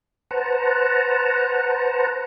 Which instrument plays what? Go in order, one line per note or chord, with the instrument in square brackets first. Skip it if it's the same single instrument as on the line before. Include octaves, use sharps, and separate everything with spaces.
[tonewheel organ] B4 C5 F#5 A5 A#5